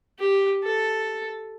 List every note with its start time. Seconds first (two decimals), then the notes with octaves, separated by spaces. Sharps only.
0.19 G4
0.64 A4